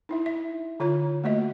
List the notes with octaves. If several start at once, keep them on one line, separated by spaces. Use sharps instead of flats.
D#4 E4 E5
E5
D3 F4 C#5 A#5
A3 A#3 F#4 D#5 E5